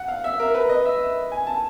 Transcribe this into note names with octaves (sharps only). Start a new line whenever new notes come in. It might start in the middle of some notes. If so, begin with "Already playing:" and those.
Already playing: F#5
F5
E5
A#4
B4
D#5
E5
G#5
A5